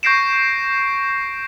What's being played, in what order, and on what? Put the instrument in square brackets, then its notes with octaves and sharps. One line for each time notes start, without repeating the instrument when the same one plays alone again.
[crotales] C#6 G6 A#6 C7 D7 E7